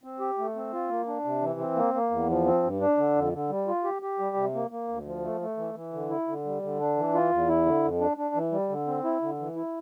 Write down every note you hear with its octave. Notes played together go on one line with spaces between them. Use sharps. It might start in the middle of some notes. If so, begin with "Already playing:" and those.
C4
G4
A3
C4
F4
A#3
D4
C3
E3
C4
A#3
A#3
E2
F3
C4
G2
D4
D3
F2
D3
G3
F4
G4
G4
G3
C3
A#3
A#3
D2
F3
A3
A3
E3
E3
D3
E4
D3
G3
D3
D4
E3
F4
E2
E4
D3
F2
D4
D4
E3
G3
D3
C4
E4
D3
E3
E4